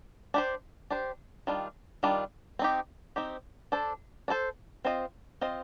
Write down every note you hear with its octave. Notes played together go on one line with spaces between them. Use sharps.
D4 G4 C5
D4 G4 C5
D#3 G3 D4 F4
D#3 G3 D4 F4
C4 D#4 G4
C4 D#4 G4
D4 A4 C5
D4 A4 C5
C4 F4 C5 D#5
C4 F4 C5 D#5